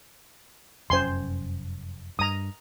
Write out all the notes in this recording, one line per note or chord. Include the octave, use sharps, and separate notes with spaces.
F1 F#2 C#4 C5 G#5 C6
G2 A#5 D#6